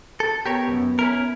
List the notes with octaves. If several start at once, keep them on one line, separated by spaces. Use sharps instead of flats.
A4
B3 G4 A#4 C#5
C2 F#2
C#4 E4 A#4